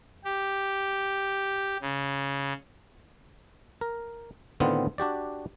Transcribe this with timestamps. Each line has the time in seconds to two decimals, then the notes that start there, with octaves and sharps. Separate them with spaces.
0.24 G4
1.82 C#3
3.81 A#4
4.60 A2 D3 D#3 B3 C4 F4
4.98 D4 F#4 G4 D5